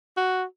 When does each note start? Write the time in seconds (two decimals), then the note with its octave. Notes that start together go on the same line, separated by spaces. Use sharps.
0.17 F#4